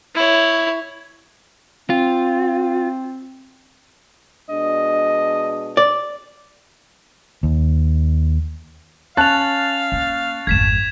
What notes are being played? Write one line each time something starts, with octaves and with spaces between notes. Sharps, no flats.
E4 C#5
C4 F4
B2 G#3 D4 D#5
D5
D#2
C#4 F5 A5 F#6 A6 F7
A#3
G#1 F2 G#6 B6 E7